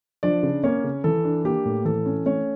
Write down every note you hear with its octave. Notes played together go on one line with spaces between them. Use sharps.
F3 D4 D5
C#3
A#3 C#4 C#5
C#3
E3 A4
D4
A#3 G4
A2
E3 A4
C#4
A3 C#4 C#5